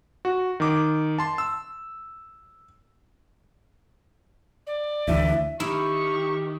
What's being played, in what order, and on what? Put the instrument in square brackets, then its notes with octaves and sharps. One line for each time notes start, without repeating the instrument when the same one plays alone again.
[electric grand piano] F#4
D#3 D6
A5 C6
E6
[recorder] D5
[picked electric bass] D2 E3 [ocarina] E5
[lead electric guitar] D#3 [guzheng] E4 [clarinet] G4 [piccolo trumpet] C#6